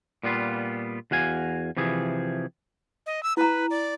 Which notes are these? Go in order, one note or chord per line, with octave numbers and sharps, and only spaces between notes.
A#2 G3 B3 F4
E2 F#4 F5 G#5
C3 E3 F3 G#4
D#5
E6
E4 B4 A#5
D5